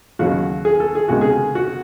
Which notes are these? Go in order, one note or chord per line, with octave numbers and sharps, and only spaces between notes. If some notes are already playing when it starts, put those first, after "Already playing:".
D#2 C#3 F#3 F#4
G#4
A4
G#4
C#2 C3 D#3 G#3 F#4
G#4
F#4